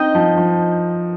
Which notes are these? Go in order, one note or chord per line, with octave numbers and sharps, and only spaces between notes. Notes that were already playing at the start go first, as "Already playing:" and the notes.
Already playing: C4 D#4 D#5 G5
F3
F3